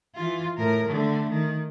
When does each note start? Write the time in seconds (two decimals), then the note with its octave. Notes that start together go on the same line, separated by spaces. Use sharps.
0.15 E3 F4
0.57 A2 A#4
0.89 D3 A3
1.30 D#3